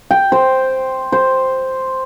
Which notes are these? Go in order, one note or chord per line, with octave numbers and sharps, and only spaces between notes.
G5
C5
C5